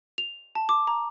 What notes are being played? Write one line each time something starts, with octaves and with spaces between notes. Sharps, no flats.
F7
A5
D6
A#5